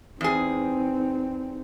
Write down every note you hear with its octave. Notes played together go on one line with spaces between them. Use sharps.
E2 C4 D#4 G#4